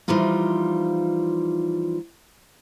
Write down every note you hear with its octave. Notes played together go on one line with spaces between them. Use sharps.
E3 F3 G3 D#4 F4